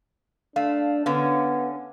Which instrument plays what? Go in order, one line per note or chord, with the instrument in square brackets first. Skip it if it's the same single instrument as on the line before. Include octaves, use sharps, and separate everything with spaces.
[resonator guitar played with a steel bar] A3 [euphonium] D4 [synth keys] F5
[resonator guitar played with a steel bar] D3 C#4 [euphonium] B3 [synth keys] F5